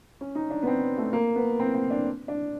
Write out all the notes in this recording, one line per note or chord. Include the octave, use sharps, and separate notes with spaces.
C#4
D#4
D4
B3
C4
A3
A#3
B3
C4
C4
D4
D4